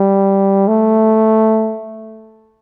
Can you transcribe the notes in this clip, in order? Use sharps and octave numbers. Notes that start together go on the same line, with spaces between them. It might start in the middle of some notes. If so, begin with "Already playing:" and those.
Already playing: G3
A3